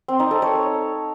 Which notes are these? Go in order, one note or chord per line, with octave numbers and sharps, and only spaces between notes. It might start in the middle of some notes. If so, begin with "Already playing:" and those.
C4
D#4
A4
C#5